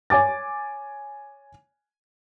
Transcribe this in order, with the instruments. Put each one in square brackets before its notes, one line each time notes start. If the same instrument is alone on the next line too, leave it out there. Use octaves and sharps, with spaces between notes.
[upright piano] C#5 G#5 D6 A6